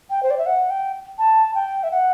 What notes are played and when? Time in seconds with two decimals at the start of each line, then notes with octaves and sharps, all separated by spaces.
0.10 G5
0.23 C5
0.31 D5
0.38 E5
0.46 F#5
0.70 G5
1.19 A5
1.55 G5
1.84 E5
1.91 F#5